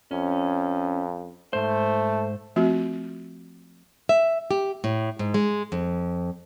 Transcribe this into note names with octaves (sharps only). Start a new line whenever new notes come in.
F2 C#4
G#2 A3 C5
F3 A3 C4 F4 F#4
E5
G4
A2
G#2
G#3
F2